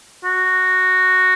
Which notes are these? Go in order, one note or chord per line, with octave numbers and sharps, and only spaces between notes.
F#4